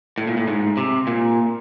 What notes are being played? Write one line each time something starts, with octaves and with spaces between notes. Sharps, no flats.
A2
A#2
A2
G#2
C3
A#2